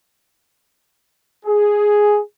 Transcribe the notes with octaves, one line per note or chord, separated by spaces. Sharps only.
G#4